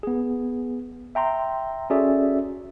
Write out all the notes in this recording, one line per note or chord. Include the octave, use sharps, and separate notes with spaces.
B3 G#4
E5 G5 A#5 C6
C#4 F#4 G#4 A4 D5 E5